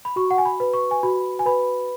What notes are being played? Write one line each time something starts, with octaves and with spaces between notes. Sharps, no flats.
B5
F#4 C#6
F#5
G#5
B5
B4
C#6
G#5
F#4 B5
G#5
B4 B5